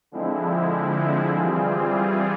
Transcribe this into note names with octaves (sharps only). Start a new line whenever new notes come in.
D3 F3 G#3 C4 E4
E3 G3 C4 F4 G#4